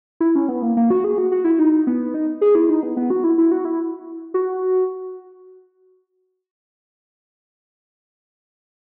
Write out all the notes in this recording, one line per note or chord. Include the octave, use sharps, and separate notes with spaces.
E4
C#4
B3
A#3
A#3
F#4
G#4
F#4
F#4
E4
D#4
B3
D#4
G#4
E4
D#4
B3
B3
F#4
E4
E4
F#4
E4
F#4